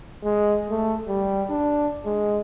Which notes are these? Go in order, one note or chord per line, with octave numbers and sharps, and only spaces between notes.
G#3
A3
G3
D4
G#3